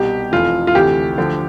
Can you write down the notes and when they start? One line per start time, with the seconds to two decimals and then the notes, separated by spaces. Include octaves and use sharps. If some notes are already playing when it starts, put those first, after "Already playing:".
Already playing: C2 B2 G4
0.32 F1 F2 E3 F4
0.67 F4
0.75 D2 C3 E3 G4
1.18 D2 D3 F3